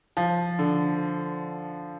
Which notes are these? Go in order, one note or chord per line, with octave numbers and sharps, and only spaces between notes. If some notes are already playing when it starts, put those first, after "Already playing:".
F3
D3